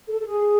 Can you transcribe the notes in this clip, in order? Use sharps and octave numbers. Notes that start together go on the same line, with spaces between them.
A4
A4
G#4